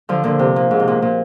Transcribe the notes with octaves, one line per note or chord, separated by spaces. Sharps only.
D3 F3
A#2 D3
C3
A#2
G#2
C3
A#2
A#2